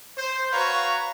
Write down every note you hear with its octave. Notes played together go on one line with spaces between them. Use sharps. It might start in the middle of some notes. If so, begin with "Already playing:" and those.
C5
F#4 B4 C#5 F5 A#5